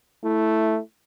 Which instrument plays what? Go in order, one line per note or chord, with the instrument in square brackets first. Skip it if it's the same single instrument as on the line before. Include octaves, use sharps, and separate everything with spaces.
[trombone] A3 [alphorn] E4